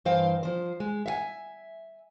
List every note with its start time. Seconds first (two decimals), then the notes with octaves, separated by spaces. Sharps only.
0.05 G2 E3 C5 F5 G5
0.43 F3 C5
0.80 G#3
1.06 E5 F5 G#5